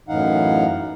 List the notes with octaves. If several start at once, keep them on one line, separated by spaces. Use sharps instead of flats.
F#2 A2 E3 D#4 F5 F#5